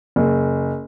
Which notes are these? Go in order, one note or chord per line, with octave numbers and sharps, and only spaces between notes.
F#1